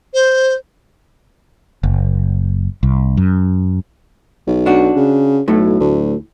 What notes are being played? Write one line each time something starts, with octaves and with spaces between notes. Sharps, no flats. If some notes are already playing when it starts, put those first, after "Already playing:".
C5
F#1
C2
F#2
B1
D4 F#4
C#3
B1 A2 F#3 A3
D2